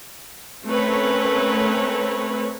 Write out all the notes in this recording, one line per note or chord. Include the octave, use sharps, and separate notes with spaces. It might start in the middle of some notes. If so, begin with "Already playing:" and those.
A3 C4 C#4 A#4 B4 C#5